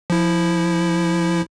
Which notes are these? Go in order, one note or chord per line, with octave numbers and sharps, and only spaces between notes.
F3 E4